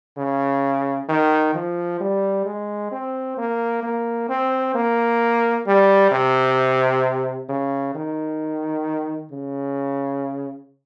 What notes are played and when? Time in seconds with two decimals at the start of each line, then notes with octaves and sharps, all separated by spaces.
0.18 C#3
1.09 D#3
1.55 F3
2.01 G3
2.46 G#3
2.92 C4
3.38 A#3
3.83 A#3
4.29 C4
4.75 A#3
5.67 G3
6.12 C3
7.49 C#3
7.95 D#3
9.32 C#3